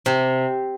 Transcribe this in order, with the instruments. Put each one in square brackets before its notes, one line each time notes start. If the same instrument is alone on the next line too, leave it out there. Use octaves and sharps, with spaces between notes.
[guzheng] C3